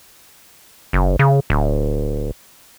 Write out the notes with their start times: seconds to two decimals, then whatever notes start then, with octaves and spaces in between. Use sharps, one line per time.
0.93 F#1
1.19 C#3
1.50 D1